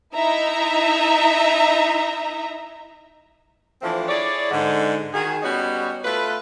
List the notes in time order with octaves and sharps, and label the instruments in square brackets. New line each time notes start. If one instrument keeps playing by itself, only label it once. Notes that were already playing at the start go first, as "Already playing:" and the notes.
[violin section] D#4 E4 D#5 E5 A#5
[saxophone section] E3 F3 A3 C4 D4
E4 G#4 C#5 D5
G#2 D3
D#3 F#4 G#4
G3 B3 C#4 D#4 F#4
A3 F4 B4